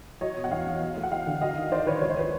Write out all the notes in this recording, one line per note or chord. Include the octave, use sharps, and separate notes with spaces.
F#3 C#5 D#5
B2
F#5
E2 D#5 F5
E2
F#3
A3
F#5
F#3 F5 G5
D3
F#3 D#5 F5
D#3
D#3 C5 D5
D#3 B4 C#5
C#2 C#5
C5
B4